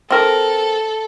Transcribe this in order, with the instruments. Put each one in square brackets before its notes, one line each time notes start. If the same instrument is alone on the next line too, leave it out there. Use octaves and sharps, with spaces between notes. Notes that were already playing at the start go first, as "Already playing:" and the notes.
[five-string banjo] C4 A#4 [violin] A4